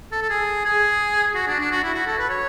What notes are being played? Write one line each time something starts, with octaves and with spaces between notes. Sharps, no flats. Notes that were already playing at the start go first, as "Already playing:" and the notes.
A4
A4
G#4
G#4
F#4
D4
D4
F#4
E4
F#4
A4
B4
C#5